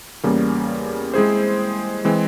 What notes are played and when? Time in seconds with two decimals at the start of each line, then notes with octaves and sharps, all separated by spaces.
0.24 E2 C#3 G3 A#3
1.14 G#3 C4 E4 G#4 C5
2.05 E3 G#3 C4